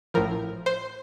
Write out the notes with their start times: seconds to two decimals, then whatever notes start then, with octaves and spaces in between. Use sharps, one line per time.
0.14 A1 A2 F3 A#4
0.66 C5